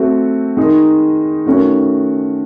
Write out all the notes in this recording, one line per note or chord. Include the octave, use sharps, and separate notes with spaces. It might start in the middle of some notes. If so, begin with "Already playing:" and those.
Already playing: A3 C4 F#4
D#3 G#3 D#4
D#3 A3 C#4 F#4